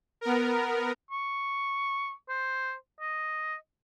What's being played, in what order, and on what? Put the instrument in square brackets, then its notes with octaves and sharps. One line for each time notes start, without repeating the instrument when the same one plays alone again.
[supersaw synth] B3 A#4
[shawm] C#6
C5
D#5